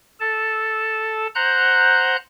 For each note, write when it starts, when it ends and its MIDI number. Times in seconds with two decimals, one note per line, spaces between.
0.20 1.27 69
0.20 1.27 81
1.35 2.16 72
1.35 2.16 78
1.35 2.16 82
1.35 2.16 90
1.35 2.16 91